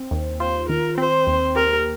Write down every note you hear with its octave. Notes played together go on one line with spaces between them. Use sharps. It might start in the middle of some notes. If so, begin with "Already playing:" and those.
Already playing: C4
D#2
F4 C5
D#3 A#4
C4 C5
D#2
G4 A#4